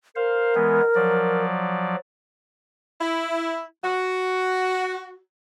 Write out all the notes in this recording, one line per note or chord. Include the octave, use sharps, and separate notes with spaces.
A#4 C5 F5
E3 G#3 B3
F3 F#3 D5
E4
F#4